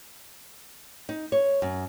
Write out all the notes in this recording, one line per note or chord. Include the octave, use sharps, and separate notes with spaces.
D#4
C#5
F#2